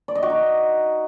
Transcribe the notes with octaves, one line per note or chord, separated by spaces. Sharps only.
D5
D#5
F#4
D#4